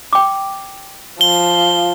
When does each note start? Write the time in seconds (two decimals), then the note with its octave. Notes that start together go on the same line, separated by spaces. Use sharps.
0.13 G5 D6
1.21 F3 G7